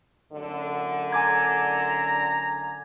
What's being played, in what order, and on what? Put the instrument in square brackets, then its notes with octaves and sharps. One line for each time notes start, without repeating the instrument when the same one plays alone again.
[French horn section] F#2 A2 D3
[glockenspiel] G#5 D6 G#6 [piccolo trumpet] A#5